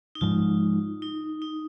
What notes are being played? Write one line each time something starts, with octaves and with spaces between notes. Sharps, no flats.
D#4
G#2 F3 G#3 F4
D#4
D#4